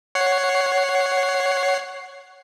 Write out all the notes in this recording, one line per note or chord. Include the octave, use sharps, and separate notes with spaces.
C#5 F#5 C7